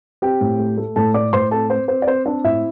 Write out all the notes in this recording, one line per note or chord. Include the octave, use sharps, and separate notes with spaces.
C4 G4 G5
A2
A3
A3
A2 A4 A5
A2 D5 D6
A2 C5 C6
C4 A4 A5
C4 C5
C4 C5
D5
C4 C5
C4 D4 D5
A2 E4 E5